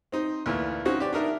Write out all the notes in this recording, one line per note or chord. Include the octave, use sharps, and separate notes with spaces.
C4 D#4
D2 A#2 E3
C4 C#4 D#4 F#4
G4 D5
D4 D#4 A#4 E5